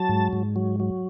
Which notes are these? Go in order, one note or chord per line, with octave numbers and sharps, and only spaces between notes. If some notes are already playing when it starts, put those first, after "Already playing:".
Already playing: F#3 A5
G#2
G#2
F#3
F#3